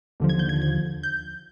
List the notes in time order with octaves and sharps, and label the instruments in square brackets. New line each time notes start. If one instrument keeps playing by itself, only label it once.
[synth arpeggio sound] D#2 D3 F3
G#6
G6
G#6
G#6
G6